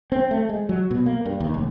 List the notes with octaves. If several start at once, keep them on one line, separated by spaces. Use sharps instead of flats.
C4
A3
G#3
F#3
B2
A#3
G2
D#2
F1